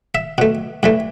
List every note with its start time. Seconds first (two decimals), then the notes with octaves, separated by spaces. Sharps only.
0.15 E5
0.38 B2 A3
0.83 G2 E3 A3